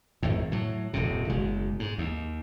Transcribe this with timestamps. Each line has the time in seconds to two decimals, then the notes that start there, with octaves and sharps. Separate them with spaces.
0.23 G#1 F2 A2
0.51 A2 F#3
0.93 D#1 F#2 C3
1.29 F#1 B2 G#3
1.79 G#2
1.98 D#2